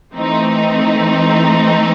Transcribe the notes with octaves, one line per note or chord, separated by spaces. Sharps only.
E3 A3 C4 D#4